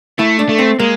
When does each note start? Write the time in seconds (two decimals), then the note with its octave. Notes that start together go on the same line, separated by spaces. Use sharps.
0.19 A3 E4
0.39 D4
0.49 A3
0.59 C4
0.79 G#3 A#3